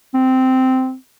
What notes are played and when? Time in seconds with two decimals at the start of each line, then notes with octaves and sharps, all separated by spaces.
0.14 C4